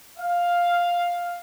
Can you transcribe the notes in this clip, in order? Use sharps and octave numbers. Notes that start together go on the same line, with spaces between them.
F5